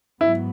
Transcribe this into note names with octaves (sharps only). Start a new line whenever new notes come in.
G#2 F#3 B3 E4